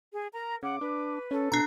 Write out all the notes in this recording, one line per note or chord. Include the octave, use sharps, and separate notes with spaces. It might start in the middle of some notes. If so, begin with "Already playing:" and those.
G#4
A#4 A#5
C#3 F#5 D6
D4 B4
C#4 A4
B2 D4 A#5